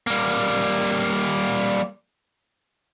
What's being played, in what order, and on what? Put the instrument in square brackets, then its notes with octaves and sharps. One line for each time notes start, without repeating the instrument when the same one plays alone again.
[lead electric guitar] G3 A#3